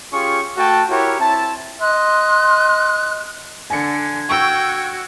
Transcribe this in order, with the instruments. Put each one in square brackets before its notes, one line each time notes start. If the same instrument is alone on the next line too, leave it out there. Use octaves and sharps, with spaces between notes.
[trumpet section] C#4 F4 G4 G#4 C#6
A3 F#4 G5 A5
E4 F#4 G4 A#4 C#5
C4 E4 A5
[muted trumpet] D#5 [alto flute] C6 [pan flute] F#6
[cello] D3 [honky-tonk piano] G#5 C#7 [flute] G#6
[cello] F#4 [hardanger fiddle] G5 [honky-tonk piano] C#6 E6